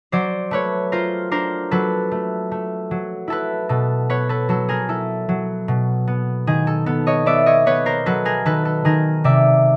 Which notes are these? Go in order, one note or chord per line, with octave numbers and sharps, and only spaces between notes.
F#3 C5 D5
A3 B4 C#5
F4 A#4 C5
D4 A#4 C5
F#3 A4 B4
A3
A3
F#3
E4 A4 B4
B2 A4
B3 B4 C#5
A4 B4
F#3 A4
G#4 A#4
E4 A4
F#3
B2
B3
D#3 G#4
A4
B3 A4
C#5 D#5
B3 D5 E5
C#5 D#5
B3 B4 C#5
A#4 C5
F#3 A4 B4
G#4 A#4
D#3 A4 B4
A4
D#3 G#4 A#4
C3 D5 E5